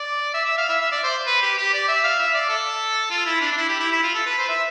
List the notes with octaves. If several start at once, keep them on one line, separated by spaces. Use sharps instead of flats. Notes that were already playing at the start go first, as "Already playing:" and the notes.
Already playing: D5
E5
E5
F5
E5
E5
D5
C5
B4
G4
G4
D5
E5
F5
E5
D5
A4
F4
E4
D4
D4
E4
G4
E4
E4
F4
A4
B4
C5
E5